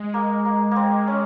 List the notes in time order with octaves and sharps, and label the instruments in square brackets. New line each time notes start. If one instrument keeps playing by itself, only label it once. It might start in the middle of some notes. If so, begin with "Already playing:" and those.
Already playing: [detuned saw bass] G#3
[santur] A#3
A#3
A#3
C4
C#4